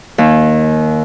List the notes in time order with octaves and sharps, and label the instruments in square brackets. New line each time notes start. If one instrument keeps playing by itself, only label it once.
[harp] D#2